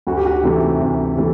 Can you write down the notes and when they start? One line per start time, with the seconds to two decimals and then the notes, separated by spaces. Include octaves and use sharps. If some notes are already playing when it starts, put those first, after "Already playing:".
0.07 D2 F#4
0.17 G4
0.26 F#4
0.43 C3 E3 A3
0.80 D2
1.16 C3 E3 A3